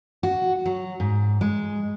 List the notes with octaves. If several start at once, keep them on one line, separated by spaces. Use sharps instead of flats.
F#4
F#3
G#2
G#3